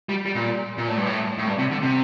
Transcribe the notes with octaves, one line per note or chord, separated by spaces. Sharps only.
G3
G3
A#2
A#2
A2
G2
A2
A2
G2
C3
D3
C3